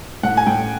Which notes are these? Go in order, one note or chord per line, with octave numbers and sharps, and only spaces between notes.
A2 F#5
G#5
A2 G5